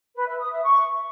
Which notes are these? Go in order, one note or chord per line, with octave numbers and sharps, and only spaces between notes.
B4
E5
D#6
E5
C#6